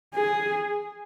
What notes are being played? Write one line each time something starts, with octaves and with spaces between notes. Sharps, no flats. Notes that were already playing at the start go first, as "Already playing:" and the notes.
G#4